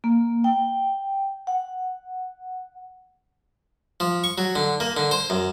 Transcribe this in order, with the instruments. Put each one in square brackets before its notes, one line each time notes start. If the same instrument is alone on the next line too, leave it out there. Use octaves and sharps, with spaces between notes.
[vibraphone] A#3
G5
F#5
[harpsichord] F3
C#6
F#3
D3
A#3
D3
C5
F#2